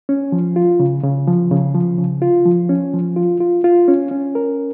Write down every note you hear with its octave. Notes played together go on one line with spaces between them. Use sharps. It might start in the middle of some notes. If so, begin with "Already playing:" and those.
C#4
F3
F4
C#3
C#3
F3
C#3
F3
C#3
F4
F3
C#4
F3
F4
F4
F4
C#4
C#4
A#4